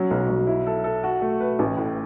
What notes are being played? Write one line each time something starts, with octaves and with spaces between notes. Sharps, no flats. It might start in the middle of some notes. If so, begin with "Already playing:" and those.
Already playing: F#3 C#4
B1
F#3
E4
A4
A4
F#4
A3
B4
A1
A2